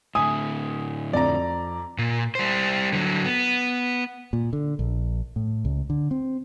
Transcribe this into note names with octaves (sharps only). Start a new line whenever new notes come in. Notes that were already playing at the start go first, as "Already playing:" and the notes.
A2 D3 G#5 D#6
F2 D5 A#5
A#2
G3 C5
D3 F#3
B3
A#2
D3
A#1
A2
C#2
D3
C4